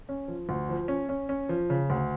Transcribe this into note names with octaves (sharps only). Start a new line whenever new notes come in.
C#4
F3
D2
F3
C#4
C#4
C#4
F3
C#3
D2